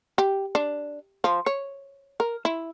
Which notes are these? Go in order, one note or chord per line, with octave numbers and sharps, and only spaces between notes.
G4
D4
F3
C#5
A#4
E4